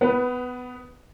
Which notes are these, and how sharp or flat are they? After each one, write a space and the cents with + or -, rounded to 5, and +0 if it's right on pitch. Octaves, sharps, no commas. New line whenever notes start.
B3 +20 B4 +0